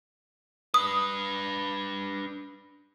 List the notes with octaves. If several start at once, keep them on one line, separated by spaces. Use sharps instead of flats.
D4 B4 D#6